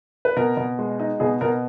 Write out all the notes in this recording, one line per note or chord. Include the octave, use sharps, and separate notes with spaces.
B4
B2 A#4
B2
G#3
D#4
B2 G#4
B2 A#4